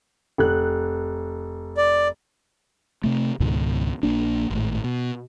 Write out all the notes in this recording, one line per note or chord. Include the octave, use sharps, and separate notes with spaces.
F1 F#6
D5
C3 A3
C#2 G#2 B2 D#3
A#1 A#3 D4
G#1 A2
B2